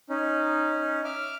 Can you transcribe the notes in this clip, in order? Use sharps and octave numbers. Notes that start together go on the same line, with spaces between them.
C#4 D#4
E5 D6 F6